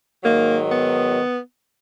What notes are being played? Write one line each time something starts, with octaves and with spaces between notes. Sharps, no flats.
G#2 D#3 F#3 A#3
B3